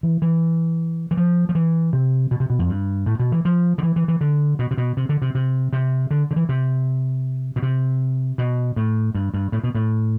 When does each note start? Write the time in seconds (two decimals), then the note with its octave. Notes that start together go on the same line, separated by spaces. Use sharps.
0.03 E3
0.22 E3
1.11 E3
1.17 F3
1.49 F3
1.55 E3
1.93 C3
2.31 B2
2.40 C3
2.50 B2
2.59 F2
2.69 G2
3.06 A2
3.20 B2
3.32 E3
3.45 F3
3.78 D3
3.83 E3
3.96 E3
4.08 E3
4.21 D3
4.59 B2
4.71 C3
4.78 B2
4.97 C3
5.09 D3
5.22 C3
5.35 C3
5.73 C3
6.11 D3
6.31 D3
6.36 E3
6.49 C3
7.56 B2
7.62 C3
8.38 B2
8.76 A2
9.15 G2
9.34 G2
9.52 A2
9.64 B2
9.75 A2